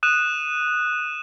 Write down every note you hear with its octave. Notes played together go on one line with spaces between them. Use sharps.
D#6 F#6 D#7 E7